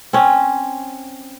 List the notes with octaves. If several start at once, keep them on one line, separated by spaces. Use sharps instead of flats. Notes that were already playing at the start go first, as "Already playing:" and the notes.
C4 C#4